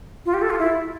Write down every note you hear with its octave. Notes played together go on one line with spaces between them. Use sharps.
F4
G4
A4
F4
E4